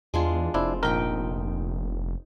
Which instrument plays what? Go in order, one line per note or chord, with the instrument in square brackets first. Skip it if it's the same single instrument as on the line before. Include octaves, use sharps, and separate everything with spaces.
[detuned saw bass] E2 [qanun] G#3 D4 F4
[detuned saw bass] F1 [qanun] C4 [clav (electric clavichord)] D4 E4
[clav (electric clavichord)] A#1 A#4 [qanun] D#4 G5